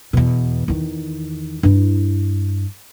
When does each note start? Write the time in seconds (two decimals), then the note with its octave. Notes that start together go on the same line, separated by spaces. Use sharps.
0.13 E2 B2
0.68 E2 D#3
1.63 G2 E4